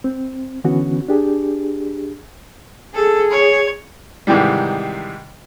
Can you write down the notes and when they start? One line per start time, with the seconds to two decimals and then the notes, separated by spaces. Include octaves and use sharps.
0.04 C4
0.64 D3 E3 B3 C#4 F#4
1.08 D4 G4 G#4
2.95 G#4 A4
3.32 C#5
4.27 G#2 C3 D#3 E3 G3